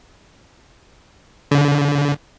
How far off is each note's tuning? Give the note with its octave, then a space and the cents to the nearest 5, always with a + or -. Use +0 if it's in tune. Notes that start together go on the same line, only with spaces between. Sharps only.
D3 -35